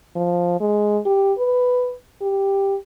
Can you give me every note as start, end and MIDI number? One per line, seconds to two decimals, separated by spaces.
0.16 0.56 53
0.60 0.99 56
1.06 1.33 67
1.38 1.94 71
2.22 2.76 67